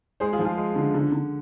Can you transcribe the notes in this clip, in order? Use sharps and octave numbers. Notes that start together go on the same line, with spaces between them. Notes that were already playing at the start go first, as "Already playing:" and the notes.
G#3 G#4 C5
F4 G#4
F3
F4 G#4
G#3
D3
D3
D3